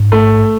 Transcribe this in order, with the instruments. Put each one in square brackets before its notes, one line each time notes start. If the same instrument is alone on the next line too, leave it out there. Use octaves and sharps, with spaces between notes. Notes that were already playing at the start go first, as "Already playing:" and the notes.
Already playing: [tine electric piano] G#2
[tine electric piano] A1 [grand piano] A3